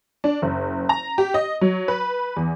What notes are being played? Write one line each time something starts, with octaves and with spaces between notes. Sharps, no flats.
D4
F#1
A#5
G4
D#5
F#3
B4
E2